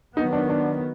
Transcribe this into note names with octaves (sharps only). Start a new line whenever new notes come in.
D#3 F#3 B3 D#4
D4
D4